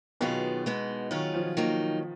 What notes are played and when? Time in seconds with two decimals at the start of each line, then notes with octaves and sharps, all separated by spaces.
0.21 B2 D#3 F#3 B3 F4 G#4
0.66 G#3 B3 D#4
1.11 D#3 F#3 C#4 F4 G#4
1.34 F3
1.57 D#3 F#3 A#3 D#4